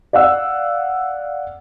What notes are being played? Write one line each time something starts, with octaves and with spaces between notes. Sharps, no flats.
D5 F5 F#5 E6